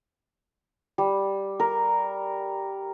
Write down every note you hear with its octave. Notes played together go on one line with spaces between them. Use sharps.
G3
A#4